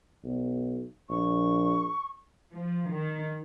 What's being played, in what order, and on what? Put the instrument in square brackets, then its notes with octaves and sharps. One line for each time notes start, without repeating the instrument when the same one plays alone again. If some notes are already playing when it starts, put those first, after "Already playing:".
[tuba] B1
[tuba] A#1 [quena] C#6
[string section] F3
D#3